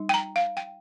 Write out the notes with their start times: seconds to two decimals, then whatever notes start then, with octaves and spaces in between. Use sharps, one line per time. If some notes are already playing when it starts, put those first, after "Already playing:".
Already playing: G3 D#4
0.09 G5
0.14 A#5
0.36 F5
0.57 G5